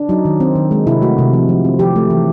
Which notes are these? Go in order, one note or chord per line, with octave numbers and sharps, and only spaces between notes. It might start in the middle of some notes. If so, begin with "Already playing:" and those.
Already playing: D4
F#3 D#4
D#3
C4
D#3
G#3
C3 E4
A3 F#4
C3
F3
F3
C4
F3 G4
A3
E3